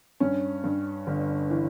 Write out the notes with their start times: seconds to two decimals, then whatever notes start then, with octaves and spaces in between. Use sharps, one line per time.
0.20 G2 C#4
0.64 G2
1.07 G1
1.50 E3